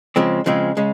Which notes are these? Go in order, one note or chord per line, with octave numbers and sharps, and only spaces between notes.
C#3 F3 G#3 C4
C#3 F3 G#3 C4
C#3 G#3